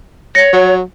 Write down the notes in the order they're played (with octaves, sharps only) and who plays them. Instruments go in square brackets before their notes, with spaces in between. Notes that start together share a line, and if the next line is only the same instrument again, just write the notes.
[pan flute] C#5 [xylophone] A#6 C#7
[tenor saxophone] F#3